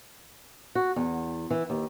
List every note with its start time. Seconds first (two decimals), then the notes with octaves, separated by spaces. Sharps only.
0.75 F#4
0.96 E2
1.50 E3
1.70 D#2